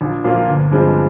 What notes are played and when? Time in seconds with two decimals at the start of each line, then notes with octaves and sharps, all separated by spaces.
0.01 A#1
0.24 A#2 F3 A#3 F4
0.48 G1
0.71 G2 F3 G#3 C4